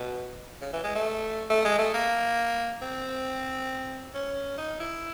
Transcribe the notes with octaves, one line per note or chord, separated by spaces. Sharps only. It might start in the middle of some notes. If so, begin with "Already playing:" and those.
Already playing: B2
C#3
E3
G#3
A3
A3
G#3
A3
A#3
C4
C#4
D#4
E4